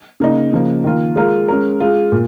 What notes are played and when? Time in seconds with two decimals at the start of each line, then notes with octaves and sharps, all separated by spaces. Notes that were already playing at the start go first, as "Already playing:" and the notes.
0.20 C#3 A#3 D#4
0.53 C#3 F3 A#3
0.84 D#3 A#3 F4
1.16 G#3 F4 A#4
1.48 G#3 C#4 A#4
1.80 G#3 F4 G#4
2.12 A#2